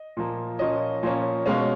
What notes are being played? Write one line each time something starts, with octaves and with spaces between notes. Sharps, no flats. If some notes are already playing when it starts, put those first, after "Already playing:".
Already playing: D#5
A#2 F3 A#3
A#2 F3 A#3 C#4 D#5
A#2 F3 A#3 C#4
B2 G#3 C#4 F5